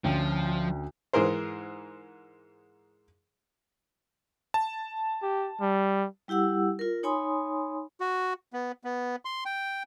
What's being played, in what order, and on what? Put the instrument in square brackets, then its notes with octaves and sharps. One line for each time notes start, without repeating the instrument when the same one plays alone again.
[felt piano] D2 C#4 G5 [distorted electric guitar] F3
[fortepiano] G#2 E3 G#4 A#4 C5
[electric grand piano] A5
[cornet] G4
G3
[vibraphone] G3 E4 G4 F#5 E6
F4 A#4
D#4 C#5 G#5 B5 C6 D#6
[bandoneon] F#4
B3
B3
C6
G5